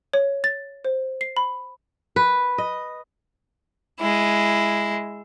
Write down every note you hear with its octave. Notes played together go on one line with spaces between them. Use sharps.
C#5
A6
C5
C7
B5
B4
D#5
G#3 E4